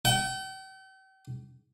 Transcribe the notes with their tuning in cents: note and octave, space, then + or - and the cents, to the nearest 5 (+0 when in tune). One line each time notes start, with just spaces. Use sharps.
G5 -40